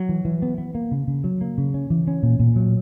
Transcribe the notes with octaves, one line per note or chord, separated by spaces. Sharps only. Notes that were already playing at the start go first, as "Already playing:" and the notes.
Already playing: F#3
E3
E3
B3
B3
A#3
C#3
C#3
F#3
A#3
C#3
C#4
E3
C#4
A#2
A#2
F#3